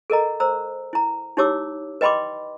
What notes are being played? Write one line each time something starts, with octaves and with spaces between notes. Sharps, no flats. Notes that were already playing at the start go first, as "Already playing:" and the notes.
A4 A#4 D#5 A#5
C5 A#5 E6
E4 A#5
D#4 E4 G4 C#5 D6 E6
B4 D#5 G5 B5 C6 D6